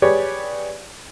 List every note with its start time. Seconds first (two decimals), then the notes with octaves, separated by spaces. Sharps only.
0.02 G4 G#4 B4 C#5 D5